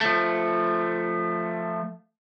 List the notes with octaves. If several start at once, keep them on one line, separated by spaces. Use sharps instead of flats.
F3 A3